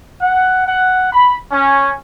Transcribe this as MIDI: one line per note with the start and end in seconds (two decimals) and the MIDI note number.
0.21 0.65 78
0.66 1.08 78
1.13 1.37 83
1.51 1.93 61